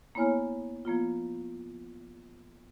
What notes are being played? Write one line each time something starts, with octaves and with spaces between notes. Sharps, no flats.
A#3 B3 E4 C#5 G#5 F6
F3 A#3 B3 F4